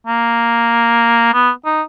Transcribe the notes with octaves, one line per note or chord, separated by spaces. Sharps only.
A#3
B3
D#4